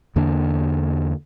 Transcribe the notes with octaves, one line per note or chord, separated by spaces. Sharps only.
E2 D3 A#3 D4